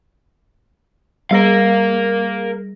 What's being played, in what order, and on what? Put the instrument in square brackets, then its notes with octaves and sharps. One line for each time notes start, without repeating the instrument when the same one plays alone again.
[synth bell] G3 G#4 A#6 [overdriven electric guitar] A#4 F5